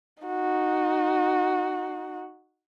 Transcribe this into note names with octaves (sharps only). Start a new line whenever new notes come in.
D#4 F#4